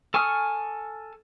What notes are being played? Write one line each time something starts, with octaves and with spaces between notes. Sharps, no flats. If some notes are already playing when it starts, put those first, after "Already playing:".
A4 G#5 C#6 D#6 F6